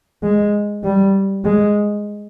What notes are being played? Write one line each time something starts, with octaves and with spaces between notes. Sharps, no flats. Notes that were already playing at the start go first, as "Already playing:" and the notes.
G#3
G3
G#3